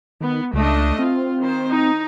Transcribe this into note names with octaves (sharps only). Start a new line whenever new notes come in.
D#3 B3
C#2 A3 D4 D#5
C4 F4
D#3 C5
D#4